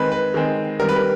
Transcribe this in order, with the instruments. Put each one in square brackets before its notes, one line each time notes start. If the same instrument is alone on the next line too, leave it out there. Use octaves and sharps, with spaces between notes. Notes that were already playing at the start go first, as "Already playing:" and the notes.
Already playing: [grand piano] D#3 G#3 C4 B4
B4
D#3 G#3 C4
D#3 G3 C4 A#4
B4
A#4